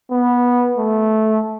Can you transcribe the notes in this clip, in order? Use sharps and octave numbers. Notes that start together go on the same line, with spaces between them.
B3
A3